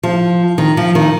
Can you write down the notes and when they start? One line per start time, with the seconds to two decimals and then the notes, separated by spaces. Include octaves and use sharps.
0.03 F3
0.58 D#3
0.77 F3
0.95 D#3